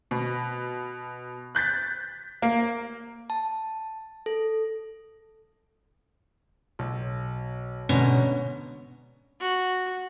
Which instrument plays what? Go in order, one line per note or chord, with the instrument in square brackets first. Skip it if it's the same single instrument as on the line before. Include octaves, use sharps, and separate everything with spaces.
[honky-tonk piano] B2
F#6 G6 A6 B6
A#3
[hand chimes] A5
A4
[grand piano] B1
[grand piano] G#2 D3 C#4 [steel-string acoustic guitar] B2
[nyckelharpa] F#4